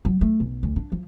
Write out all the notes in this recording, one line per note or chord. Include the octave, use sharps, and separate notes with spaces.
F#3
A3
B1
D2
D4
F3